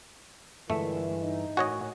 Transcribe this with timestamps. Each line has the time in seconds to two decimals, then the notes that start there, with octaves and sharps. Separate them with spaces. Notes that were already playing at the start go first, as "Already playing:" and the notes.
0.70 G2 A#2 D3 E3 G#3 A3 G#4 E5
1.22 D#4
1.57 A2 F#4 A#4 C#5 D#5 G#5